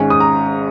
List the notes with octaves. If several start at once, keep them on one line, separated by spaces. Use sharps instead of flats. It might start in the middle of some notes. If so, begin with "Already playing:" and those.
Already playing: G#1 G#2 G#3 C#4
D#6
A#5